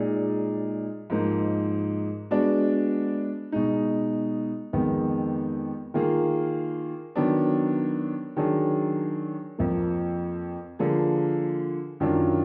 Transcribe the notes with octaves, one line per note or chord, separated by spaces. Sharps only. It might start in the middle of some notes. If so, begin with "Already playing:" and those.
Already playing: A#2 G#3 D#4 G#4 D5
G#2 F3 A#3 D#4
G#3 B3 D4 F#4 D5
B2 G#3 D#4
F2 D#3 G#3 B3
D#3 A#3 F4 G#4
D#3 F#3 B3 D4
D#3 F#3 D4 G#4
F2 F3 A#3
D3 F3 A#3 F4 G#4
F#2 D#3 F#3 D4 F4